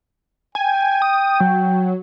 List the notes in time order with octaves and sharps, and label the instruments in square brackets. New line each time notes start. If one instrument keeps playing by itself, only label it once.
[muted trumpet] G5 [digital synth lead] G#5
[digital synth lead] D#6
F#3